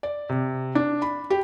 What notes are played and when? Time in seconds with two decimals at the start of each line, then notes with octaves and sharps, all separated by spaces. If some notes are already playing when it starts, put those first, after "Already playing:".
0.03 D5
0.29 C3
0.75 D4
1.02 B5
1.30 G4